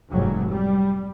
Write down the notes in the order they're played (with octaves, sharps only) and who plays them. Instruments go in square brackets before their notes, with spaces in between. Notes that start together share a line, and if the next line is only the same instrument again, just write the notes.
[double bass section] F1 G#2 F#3 G3
G3